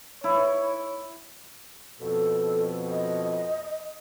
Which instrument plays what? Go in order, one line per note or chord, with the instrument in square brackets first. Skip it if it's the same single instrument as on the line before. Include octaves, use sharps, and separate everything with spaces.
[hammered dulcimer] E4 [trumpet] C#5
[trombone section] F2 B2 [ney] A4
[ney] D#5